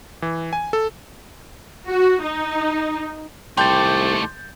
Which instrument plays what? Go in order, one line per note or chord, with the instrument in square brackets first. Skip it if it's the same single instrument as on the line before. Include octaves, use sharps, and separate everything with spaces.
[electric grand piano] E3
G#5
A4
[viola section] F#4
D#4
[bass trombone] C2 [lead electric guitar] D#3 A3 [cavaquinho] D5 G5 [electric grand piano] C6 G6 A6